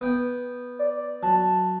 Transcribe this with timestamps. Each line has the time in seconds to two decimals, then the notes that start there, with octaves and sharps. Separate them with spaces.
0.01 B3 G5
0.79 D5
1.23 F#3 A5